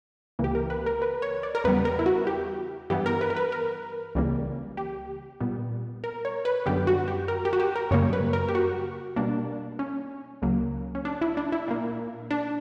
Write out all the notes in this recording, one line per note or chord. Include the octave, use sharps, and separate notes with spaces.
C#2 C#3 E3 A#3
G4
A#4
B4
A#4
B4
C#5
D5
A#4
E2 C#3 G3 B3 B4
A#4
E4
F#4
G4
G2 E3 B3 G4
A#4
B4
A#4
B4
A#4
C#2 C#3 E3 G3 A#3
G4
A#2 G3 B3
A#4
C#5
B4
F#2 D3 G3 B3 G4
F#4
G4
A#4
G4
F#4
G4
A#4
F#2 C#3 G3 A#3 C#5
B4
A#4
G4
F#4
B2 G3 A#3 D4
C#4
C#2 C#3 F#3 A#3
C#4
D4
E4
D4
E4
A#2 A#3
D4